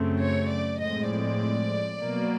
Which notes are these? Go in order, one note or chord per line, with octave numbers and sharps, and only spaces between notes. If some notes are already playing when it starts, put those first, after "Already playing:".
Already playing: F#2 C#3 F#3 A3 C4
C#5
D5
A2 F3 G#3 C4 D#5
D5
B2 F#3 A#3